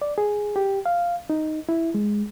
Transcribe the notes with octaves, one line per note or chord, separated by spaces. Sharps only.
D5
G#4
G4
F5
D#4
E4
G#3